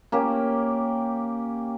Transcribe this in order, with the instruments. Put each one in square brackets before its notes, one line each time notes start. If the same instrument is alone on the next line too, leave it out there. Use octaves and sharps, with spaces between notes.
[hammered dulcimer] A#3 C#4 G4